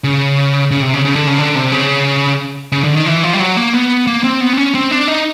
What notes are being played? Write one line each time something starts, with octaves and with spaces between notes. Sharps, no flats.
C#3
C#3
C3
C#3
C#3
D3
C#3
D3
C3
C#3
C#3
D3
D#3
E3
F3
G3
F#3
A#3
B3
A#3
C4
B3
C4
C#4
C4
D4
D#4